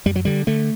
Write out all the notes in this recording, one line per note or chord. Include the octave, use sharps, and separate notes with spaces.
F#2 G3
F#3
D3 G3
D3 A3